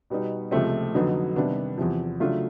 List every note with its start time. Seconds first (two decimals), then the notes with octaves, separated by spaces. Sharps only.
0.10 B2 G3 B3 D#4
0.51 C#2 C3 F3 A3 C4
0.95 F2 D3 F#3 B3 D#4
1.36 C3 D#3 G3 B3 D4
1.77 E2 C3 F3
2.20 C#3 F#3 A3 D4 F4